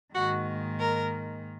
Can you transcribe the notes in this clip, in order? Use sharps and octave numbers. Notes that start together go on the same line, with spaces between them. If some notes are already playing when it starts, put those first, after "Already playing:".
G#2 D#3 A#3 F#4
A#4